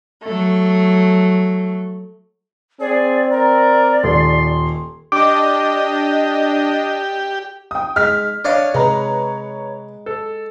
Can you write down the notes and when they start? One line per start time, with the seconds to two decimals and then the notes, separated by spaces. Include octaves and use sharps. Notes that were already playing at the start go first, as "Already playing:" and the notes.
0.22 F#3 A3
2.80 C4 G#4 D5
3.31 A#4 D5
4.03 D#1 C6
5.12 D4 G4 D#5 D6
7.71 G5 D#6
7.96 G#3 F6 B6
8.45 D4 C#5 D#5 F5
8.74 C3 G#3 B4 A#5
10.06 A4